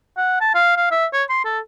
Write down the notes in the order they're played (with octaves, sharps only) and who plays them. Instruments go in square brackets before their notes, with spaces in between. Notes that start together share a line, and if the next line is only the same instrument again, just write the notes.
[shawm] F#5
A5
F5
F5
E5
C#5
C6
A4